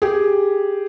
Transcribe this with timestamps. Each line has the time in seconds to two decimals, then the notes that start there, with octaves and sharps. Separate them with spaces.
0.02 G4 G#4